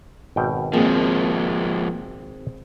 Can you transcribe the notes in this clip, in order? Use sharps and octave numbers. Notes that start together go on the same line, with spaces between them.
G#1 B2 G5
F3 G#3 A#3 C4 G#4